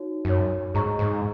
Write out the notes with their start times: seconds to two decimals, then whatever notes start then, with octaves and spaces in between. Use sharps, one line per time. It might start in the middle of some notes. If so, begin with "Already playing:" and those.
Already playing: D#4 F#4 C#5
0.25 F#2 D#4 F#4 C#5
0.74 G#2 G#4 D#5 A#5 C#6
0.99 G#2